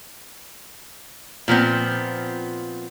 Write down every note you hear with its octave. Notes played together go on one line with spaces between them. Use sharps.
A#2 F3 B3 C4